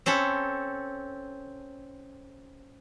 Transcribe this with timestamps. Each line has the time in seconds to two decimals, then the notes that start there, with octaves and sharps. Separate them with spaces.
0.06 C4 C#4 A4 B5